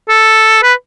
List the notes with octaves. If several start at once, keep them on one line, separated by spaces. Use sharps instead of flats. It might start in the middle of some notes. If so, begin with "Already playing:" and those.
A4
B4